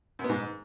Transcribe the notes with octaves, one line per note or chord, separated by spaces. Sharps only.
F#2
B3
G#2